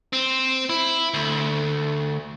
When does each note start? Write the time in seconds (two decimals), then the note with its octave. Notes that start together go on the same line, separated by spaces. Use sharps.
0.13 C4
0.69 E4
1.14 D2